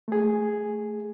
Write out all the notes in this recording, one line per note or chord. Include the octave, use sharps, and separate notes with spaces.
A3 G#4